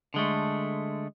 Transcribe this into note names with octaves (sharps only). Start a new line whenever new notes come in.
D3 G#3 A3